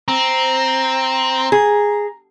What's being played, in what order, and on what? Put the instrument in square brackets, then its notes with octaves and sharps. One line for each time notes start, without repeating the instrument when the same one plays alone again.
[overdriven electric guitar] C4 [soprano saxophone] A#5
[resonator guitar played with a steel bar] G#4